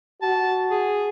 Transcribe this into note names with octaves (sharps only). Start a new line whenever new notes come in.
F#4 A5
G#4